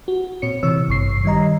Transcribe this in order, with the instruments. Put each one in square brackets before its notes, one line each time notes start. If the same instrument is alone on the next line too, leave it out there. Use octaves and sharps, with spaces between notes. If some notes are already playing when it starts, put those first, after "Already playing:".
[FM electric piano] F#4
A#2 C4 C#5 C#7
C3 E3 C#5 E6
G#1 G2 C#6 C7
D#3 G3 D#5 A#5